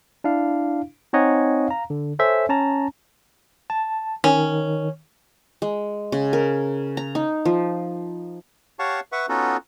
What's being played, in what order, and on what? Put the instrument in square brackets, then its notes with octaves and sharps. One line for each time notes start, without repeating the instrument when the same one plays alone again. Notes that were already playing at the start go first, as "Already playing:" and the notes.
[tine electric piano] D4 E4 F5
C4 D#4 C#5 D#5 F#5 G#5
F5 A#5
D3
A4 C5 C#5 E5 G#5
C#4 A5 A#5
A5
[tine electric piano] D#3 [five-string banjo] C#4
[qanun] G#3
C#3
A#4
A#5
D#4
F3
[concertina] G4 C#5 F5 F#5 A5 C#6
B4 E5 F#5 C#6
B3 C#4 D#4 F4 F#4 A4